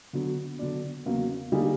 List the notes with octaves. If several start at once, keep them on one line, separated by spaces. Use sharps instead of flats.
D3 F#3 B3
D3 F#3 B3 D4
E2 C#3 F#3 A#3
D3 G3 A#3 D#4 G#4